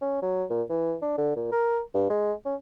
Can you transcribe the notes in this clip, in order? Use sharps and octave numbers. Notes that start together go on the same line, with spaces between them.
C#4
F#3
A#2
E3
D4
D3
A#2
A#4
G2
G#3
C#4